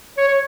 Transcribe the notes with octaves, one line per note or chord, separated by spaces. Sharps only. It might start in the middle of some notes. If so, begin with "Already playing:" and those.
C#5
C#5